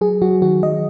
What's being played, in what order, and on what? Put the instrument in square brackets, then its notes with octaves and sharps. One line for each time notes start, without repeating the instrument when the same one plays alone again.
[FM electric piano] F#3 G#4
F#3 F#4
D#3 F#4
F#3 D#5